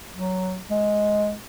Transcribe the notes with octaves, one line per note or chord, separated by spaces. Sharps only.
F#3
G#3